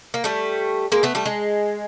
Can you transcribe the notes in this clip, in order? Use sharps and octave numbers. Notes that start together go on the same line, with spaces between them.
A#3
G3 A3
G#3 A#3
A3 B3
G3 A3
G#3